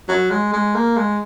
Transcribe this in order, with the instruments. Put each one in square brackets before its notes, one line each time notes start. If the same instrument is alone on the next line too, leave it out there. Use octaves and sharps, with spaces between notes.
[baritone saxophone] F#3
G#3
G#3
A#3
G#3